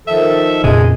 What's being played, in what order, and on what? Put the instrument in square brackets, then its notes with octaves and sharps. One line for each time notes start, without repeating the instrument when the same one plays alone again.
[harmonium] D#3 F3 A4 [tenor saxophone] E5
[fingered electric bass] F2 A#2 C#3 [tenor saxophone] G#3